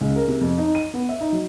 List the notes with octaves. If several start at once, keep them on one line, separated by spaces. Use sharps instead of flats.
C#2
A#4
C3
F2
D#4
D#7
B3
E5
D#4
F#3